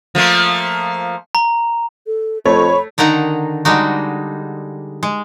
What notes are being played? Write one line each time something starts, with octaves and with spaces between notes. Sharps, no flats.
F3 A3 A#3
A#5
A4
F2 A3 C#5 B5
D3 D#3 D#4 F#5 A#5
D3 G3 G#3 D#4 F#4
G#3